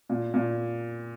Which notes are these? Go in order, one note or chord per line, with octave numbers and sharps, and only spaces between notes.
A#2
A#2